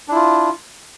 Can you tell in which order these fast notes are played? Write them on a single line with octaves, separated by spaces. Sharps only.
D4 E4 F4